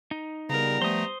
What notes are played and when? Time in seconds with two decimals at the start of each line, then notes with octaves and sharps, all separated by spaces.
0.11 D#4
0.50 C#3 G3 B3 A#4 A#5
0.82 F3 A3 C5 D#6